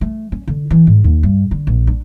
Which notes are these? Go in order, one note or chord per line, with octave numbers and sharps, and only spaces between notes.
A3
C#4
D3
E3
G#2
D#2
G2
D3
A#1
D4